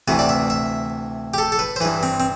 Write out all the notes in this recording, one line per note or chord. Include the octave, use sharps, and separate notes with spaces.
D2 C3 E3 B4
D5
E5
E5
G4
A4
A4
B4
C5
G2 E3 B4
C4
C4